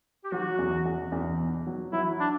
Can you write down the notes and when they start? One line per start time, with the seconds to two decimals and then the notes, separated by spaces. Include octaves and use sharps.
0.24 G4
0.31 F#3 F#4
0.59 E2
0.86 E2
1.12 E2
1.40 B2
1.67 F#3
1.93 F#3 E4
2.20 D4